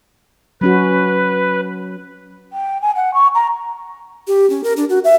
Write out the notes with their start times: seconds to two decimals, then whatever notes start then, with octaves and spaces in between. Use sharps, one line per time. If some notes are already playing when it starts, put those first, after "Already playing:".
0.61 F#3 C#4 F#4 B4
2.53 G5
2.82 G#5
2.96 F#5
3.14 C#6
3.35 A#5
4.27 G4
4.50 C#4
4.64 A#4
4.77 D4
4.90 F#4
5.04 E5